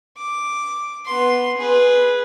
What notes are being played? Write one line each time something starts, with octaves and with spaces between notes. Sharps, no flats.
D6
B3 C6
G#4 B4